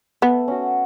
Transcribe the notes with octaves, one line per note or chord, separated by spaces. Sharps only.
A3 B3
C#4 F#4